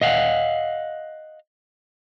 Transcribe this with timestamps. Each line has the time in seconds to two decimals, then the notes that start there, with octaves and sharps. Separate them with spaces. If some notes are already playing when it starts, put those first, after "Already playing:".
0.01 D#5 F5 F#5